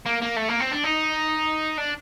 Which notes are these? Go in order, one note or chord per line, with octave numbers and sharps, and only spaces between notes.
A#3
A#3
A3
A#3
C4
D4
D#4
D4